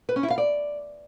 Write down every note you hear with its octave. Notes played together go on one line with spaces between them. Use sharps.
B4
C#4
E4
F5
D5